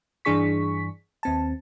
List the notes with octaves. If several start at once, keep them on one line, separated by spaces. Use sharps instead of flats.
G2 E3 D4 G#4 C#6 B6
D#2 C4 A5